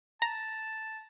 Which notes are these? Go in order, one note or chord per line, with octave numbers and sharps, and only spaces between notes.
A5 A#5